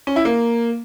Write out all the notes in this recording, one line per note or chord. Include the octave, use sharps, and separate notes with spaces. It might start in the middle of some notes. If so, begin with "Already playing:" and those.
C#4
E4
A#3